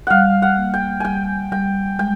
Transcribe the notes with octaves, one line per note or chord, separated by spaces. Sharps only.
G3 F5 F#5
F#5
A#3
G5
G3 G5 G#5
G3 G5
G#3 G5